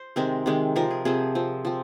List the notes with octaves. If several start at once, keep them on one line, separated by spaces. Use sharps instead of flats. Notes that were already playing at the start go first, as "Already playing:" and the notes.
Already playing: C5
C3 D#3 G#3 C4 A#4
C3 D#3 G#3 C4
C3 F3 C4 A#4
G#4
C3 F3 C4 G#4
F3 C4
F3 C4